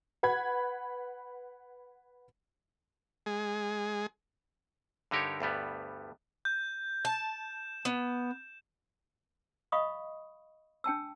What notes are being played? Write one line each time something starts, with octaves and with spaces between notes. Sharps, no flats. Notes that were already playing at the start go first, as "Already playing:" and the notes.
B4 F#5 B5 G#6
G#3 G#4
G2 D3 D#4 G4 A#4 C#5
D2 G2 G3 B3
G6
A5 G6 E7
B3
D#5 F5 B5 C#6 D#6
D4 G5 A5 E6